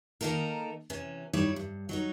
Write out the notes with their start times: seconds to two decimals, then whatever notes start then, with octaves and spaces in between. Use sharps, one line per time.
0.21 D#3 A#3 D#4 A4 A#4
0.90 C3 E3 C#4
1.33 G2 G3 D#4 E4 C#5 D5
1.56 G2
1.89 F#3 D#4 C#5